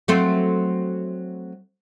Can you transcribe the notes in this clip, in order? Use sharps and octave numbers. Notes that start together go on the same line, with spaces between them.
F#3 A3 C4